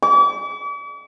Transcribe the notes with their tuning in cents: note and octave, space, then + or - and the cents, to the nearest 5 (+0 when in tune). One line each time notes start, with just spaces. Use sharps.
D6 -45